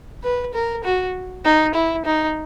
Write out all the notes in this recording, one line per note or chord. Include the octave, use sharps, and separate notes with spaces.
B4
A#4
F#4
D#4
E4
D#4